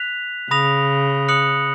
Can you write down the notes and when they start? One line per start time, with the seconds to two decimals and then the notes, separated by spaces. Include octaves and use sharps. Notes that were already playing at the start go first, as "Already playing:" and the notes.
Already playing: F#6 B6 F7
0.51 C#3 B5 D#6 A#6 F7
1.28 D#6 F#6 C#7 F#7